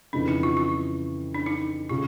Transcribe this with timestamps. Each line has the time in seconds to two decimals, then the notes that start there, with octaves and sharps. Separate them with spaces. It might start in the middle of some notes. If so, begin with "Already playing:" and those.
0.13 F2 C#3 E3 D4
0.28 D#4
0.43 F4
0.57 F4
1.35 D4
1.46 D#4
1.89 C#3 F4